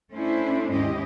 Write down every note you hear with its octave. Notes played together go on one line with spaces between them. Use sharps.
A3 C#4 D4 E4 C5
D#2 G#2 C#4 E4 G4 D#5